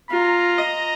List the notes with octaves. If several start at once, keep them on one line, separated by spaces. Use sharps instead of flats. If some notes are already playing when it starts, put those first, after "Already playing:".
F4 A#5
D#5